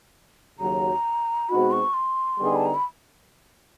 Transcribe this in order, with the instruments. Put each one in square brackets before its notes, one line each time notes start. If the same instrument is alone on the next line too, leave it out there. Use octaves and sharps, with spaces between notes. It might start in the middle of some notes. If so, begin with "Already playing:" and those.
[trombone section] D#2 C#3 F#3 [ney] A#5
[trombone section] B2 G#3 C4 D#4 F#4 [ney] B5
[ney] C#6
C6
[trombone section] D3 G3 B3 D#4 G#4
[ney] A5
A#5
B5